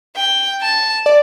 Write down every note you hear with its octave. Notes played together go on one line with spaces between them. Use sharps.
G5
A5
D5